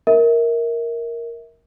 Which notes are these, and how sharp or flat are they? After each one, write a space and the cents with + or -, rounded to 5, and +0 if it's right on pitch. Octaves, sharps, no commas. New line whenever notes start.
A#4 +0 E5 -30